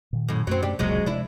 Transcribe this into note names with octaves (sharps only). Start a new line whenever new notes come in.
A#2 D#3
F#2 A2
F#2 F#3 A3 C4 C#4
D4 G4
F1 C#2 A#2 F#3 G#3 C#4
C3 F3 G#3 D4 E4